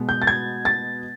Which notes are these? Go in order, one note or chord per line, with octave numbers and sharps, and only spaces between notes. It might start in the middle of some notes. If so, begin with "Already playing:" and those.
Already playing: B2 G#3 B3
G6
A6
G#6
A6